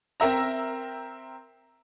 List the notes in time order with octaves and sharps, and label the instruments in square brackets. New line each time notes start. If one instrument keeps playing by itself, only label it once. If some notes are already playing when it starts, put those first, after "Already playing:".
[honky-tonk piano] C4 A#4 E5 A#5